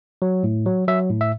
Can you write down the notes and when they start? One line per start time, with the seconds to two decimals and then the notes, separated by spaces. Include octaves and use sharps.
0.22 F#3
0.43 A2
0.66 F#3
0.88 F#3 E5
1.10 A2
1.21 E5